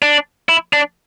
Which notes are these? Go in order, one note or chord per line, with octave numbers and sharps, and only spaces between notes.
D4
E4
D4